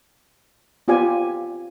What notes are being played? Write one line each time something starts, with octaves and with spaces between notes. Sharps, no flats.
B3 C4 F4 G4 D5 G#5